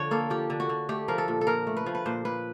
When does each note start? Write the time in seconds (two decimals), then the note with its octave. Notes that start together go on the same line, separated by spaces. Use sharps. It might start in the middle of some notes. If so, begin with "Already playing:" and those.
Already playing: D3 F3 C#5
0.11 A#3 A4
0.30 F3 G4
0.50 D3
0.60 F#4
0.69 D3
0.89 A3 G4
1.08 F3 A#4
1.18 A4
1.28 A#2
1.41 A4
1.47 A#2 A#4
1.67 A3
1.77 B4
1.86 F3
1.95 B4
2.06 A#2 C5
2.25 A#2 B4